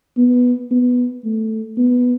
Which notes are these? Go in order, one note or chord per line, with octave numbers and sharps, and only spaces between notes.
B3
B3
A3
B3